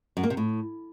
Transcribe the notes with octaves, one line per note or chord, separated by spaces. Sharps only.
F#2
A#3
C3
A2